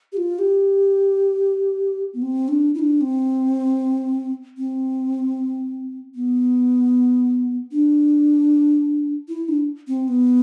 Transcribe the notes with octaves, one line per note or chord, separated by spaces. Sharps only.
G4
F4
G4
B3
C4
D4
E4
D4
C4
C4
B3
D4
E4
D4
C4
B3